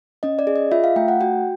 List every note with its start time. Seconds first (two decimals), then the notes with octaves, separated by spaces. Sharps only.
0.23 C#4 D#5
0.39 D5
0.47 G#4
0.56 D#5
0.72 F4 E5
0.84 F5
0.96 A3 G5
1.08 F#5
1.21 F#4 G5